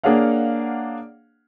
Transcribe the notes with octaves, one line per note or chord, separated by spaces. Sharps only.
A#3 D4 G#4 C#5 F5 F#5